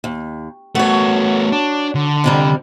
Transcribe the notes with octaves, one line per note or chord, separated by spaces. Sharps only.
D#2
A3 B3 F#4 C#5
D4
D3
F2 C3 G3